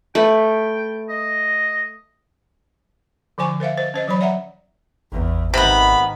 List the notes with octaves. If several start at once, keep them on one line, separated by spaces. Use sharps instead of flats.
A3 B4 G5
D#5
D3 F3 C5 G#5 C#6
A#4 C5 E5 F5
C5 D#5
C#4 C5 D#5
E3 F#3 C5 C#5 B5
D5 E5 F#5 A#5
G#1 E2
G#2 C3 D#3 B3 B5